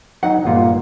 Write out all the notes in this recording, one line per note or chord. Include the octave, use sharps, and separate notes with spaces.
F#3 D#4 F#5
G1 A#2 F4